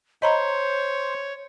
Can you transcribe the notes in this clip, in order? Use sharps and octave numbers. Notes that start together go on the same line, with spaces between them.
C5 C#5 D#5 A#5 B5